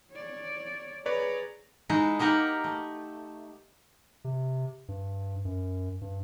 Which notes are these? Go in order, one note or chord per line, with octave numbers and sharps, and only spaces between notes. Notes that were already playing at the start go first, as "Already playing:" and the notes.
C#5 D5
G#4 B4 C#5 D5 A#5
G#3 D#4 E4 F#4
A#3 D#4 G4 A#4 F#5
A3
C3
G2
F#2
G2